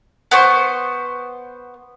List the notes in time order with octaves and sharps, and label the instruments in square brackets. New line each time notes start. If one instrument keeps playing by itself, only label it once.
[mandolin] B3 C5 C#6